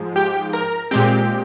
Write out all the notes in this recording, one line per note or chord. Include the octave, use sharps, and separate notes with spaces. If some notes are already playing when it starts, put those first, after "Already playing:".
Already playing: G#2 F3 G#3
G4 G5
A#4 A#5
A#2 G#3 C4 G4 G5